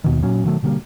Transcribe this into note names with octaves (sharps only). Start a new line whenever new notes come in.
D#2 B2 D#3
A#2 F#3 C#4
B2 D#3 F#3 A3
B2 D3 G3 A#3